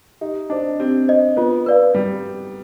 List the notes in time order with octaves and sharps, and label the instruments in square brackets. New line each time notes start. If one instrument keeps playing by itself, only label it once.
[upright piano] D#4 [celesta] G4
[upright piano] D4 [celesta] C5 D#5
[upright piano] C4 [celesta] G4
[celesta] C5 D#5
[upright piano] B3 [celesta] F4
[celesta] B4 D5 F5
[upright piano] G3